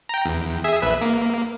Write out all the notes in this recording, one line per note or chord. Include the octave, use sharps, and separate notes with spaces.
G5 A#5
E2
G#4 E5
A#1 B4 E5
A#3